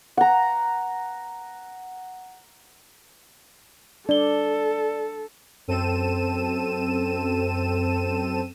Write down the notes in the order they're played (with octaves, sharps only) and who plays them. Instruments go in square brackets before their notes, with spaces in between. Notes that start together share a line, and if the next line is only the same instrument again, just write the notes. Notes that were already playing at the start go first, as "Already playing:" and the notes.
[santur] F#5 A#5
[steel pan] D4 [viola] A4 [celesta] D5 G7
[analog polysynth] F#2 C4 A4 D#7 E7